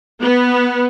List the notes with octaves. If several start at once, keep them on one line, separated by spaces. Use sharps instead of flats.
B3